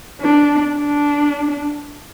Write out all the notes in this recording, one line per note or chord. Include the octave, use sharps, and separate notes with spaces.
D4
D4